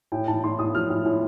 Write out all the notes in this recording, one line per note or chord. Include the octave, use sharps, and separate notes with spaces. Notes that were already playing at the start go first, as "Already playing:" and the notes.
A2 G5
A2 A5
A2 C6
A2 D#6
F3 F6
A2
A2